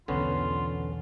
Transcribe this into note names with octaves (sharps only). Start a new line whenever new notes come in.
B1 E2 D3 B3 C#4 F4